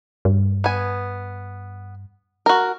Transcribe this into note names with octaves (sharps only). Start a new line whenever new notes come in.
G2
B3 G#5
F#4 A#4